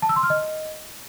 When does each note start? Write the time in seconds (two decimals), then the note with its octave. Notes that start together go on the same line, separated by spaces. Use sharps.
0.02 A5
0.09 E6
0.16 C6
0.23 F6
0.30 D#5